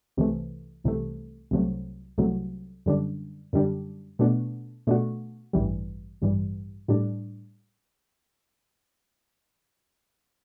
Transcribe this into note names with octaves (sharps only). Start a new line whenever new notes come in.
C2 C3 E3 A3
C2 C3 E3 A3
C2 C3 F#3 A3
C2 C3 F#3 A3
F#2 D3 G3 D4
F#2 D3 G3 D4
B2 A3 D4 F#4
B2 A3 D4 F#4
A1 G2 E3 G3
A1 G2 E3 G3
A2 G3 D4